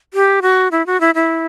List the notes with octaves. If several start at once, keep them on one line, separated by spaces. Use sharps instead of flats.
G4
F#4
E4
F#4
E4
E4